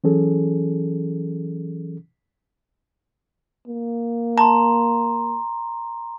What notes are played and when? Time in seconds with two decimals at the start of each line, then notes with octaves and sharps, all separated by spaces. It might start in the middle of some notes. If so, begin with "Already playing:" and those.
0.04 E3 F#3 C#4 G#4 A4
3.67 A#3
4.38 A5 A#5 C6